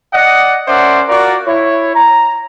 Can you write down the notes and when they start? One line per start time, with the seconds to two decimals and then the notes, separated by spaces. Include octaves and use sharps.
0.14 D5 D#5 F#5
0.68 C#4 A#4 C5 D5 E5 F#5
1.09 F4 F#4 A#4 D5
1.47 E4 C#5
1.95 A#5